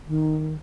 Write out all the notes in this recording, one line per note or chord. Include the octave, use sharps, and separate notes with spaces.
D#3